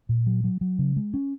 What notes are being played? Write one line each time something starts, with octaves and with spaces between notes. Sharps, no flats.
A#2
F#3
F#3
F#3
C#3
G#3
C#4